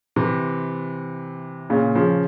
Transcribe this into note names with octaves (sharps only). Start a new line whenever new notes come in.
C3 E3
A#2 C#3
C#3 F3